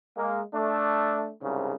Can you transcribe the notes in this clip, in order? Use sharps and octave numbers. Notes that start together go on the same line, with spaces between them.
G#3 A#3
A3 D4
C2 G#2 C#3